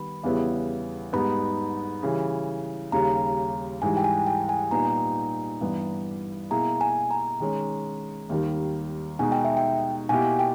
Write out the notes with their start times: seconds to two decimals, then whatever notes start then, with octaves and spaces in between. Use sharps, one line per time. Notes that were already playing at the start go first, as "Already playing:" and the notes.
Already playing: D#3 G3 B3 B5
0.23 E2 C#3 G3 B3 E4
1.13 G#2 G3 B3 D#4 B5
2.03 C#3 E3 G3
2.92 D#2 C#3 G3 A#5
3.82 G#2 E3 G3 G#5
3.97 G5
4.04 G#5
4.27 G5
4.49 G#5
4.71 A#2 G3 B3 D#4 A#5
5.61 G2 E3 G3 B3
6.50 B2 A#3 E4 G#4 A#5
6.81 G#5
7.11 A#5
7.40 D#3 G#3 C#4
8.29 D#2 D#3 G3
9.19 B2 G#3 D#4 G#5
9.32 G5
9.44 E5
9.57 G5
10.09 B2 A#3 E4 G4 G#5
10.39 G5